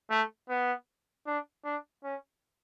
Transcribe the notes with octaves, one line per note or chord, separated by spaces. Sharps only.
A3
B3
D4
D4
C#4